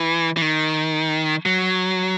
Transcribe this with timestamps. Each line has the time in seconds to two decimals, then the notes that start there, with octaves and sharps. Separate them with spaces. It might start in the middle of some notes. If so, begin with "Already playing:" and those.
Already playing: E3
0.37 E3
0.42 D#3
1.46 F#3